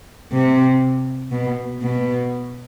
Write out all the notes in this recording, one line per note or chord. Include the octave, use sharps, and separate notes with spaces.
C3
B2
B2